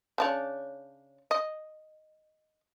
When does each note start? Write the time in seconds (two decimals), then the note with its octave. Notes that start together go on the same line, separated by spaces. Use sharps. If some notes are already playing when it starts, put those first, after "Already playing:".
0.18 C#3 D4 C#5
1.31 D#5